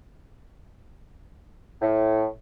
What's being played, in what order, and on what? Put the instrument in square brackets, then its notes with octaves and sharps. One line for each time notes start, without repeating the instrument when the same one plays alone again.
[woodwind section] A2